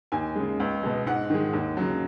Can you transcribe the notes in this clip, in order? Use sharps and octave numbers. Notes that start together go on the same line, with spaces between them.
D#2 G#5
C#3 G#3
C#2
B2 G#3
G#2 F#5
D#3 G#3
D#2
C#3 F#3